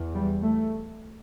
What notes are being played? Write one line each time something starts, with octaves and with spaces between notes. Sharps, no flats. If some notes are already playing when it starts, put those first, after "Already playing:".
Already playing: E2
G3
A3